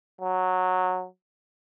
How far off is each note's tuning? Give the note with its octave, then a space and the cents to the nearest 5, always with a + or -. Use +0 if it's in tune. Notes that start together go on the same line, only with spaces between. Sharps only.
F#3 -10